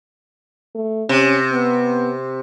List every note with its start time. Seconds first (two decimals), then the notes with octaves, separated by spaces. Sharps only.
0.75 A3
1.09 C3 C#4
1.52 B3